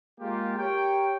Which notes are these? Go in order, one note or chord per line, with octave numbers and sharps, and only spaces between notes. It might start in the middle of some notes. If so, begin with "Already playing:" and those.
G#3 A#3 F4 G4
G4 A#4 C#5 G5